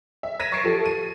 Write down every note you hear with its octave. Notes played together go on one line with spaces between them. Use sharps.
E5
G#6 A#6 B6 D#7 E7
C#6 A6 A#6 C7 D7
F3 G4 A4
D#7